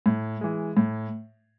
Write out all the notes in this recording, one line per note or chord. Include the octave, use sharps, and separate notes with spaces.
A2
E3 G#3
A2